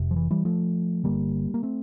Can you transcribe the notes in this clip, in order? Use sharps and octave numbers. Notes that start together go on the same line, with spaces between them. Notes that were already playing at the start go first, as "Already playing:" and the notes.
Already playing: F1 F2 C3
F3
E3
E3 G3
F3 A3
G1 G2 D3 G3 A#3
A#3
A3 C4